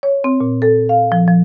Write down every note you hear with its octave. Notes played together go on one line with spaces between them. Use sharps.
C#5
C4
A#2
A4
F5
F3
F3